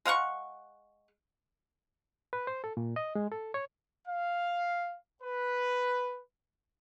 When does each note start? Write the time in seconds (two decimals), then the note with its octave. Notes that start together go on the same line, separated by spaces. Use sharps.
0.05 G#3 F5 F#5 C#6
2.33 B4
2.47 C5
2.64 A4
2.77 A#2
2.96 D#5
3.15 G#3
3.32 A4
3.54 C#5
4.07 F5
5.22 B4